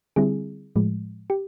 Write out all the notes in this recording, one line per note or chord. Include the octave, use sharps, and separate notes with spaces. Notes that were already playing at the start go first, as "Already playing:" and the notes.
D3 G3 C4 E4 G#4
A2 F3 G#3
G4